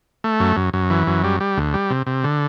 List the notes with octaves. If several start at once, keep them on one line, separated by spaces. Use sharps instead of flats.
A3
F#2
F#2
F#2
E3
F#2
G3
G3
D2
G3
C3
C3
D3